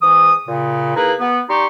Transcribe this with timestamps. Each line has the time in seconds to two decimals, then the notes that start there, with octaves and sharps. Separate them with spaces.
0.01 G#2 E3 D#6
0.47 A#2 C#3
0.95 A#3 D#4 E4 G#4 B4
1.19 B3
1.49 G3 D#4 G4 C6 C#6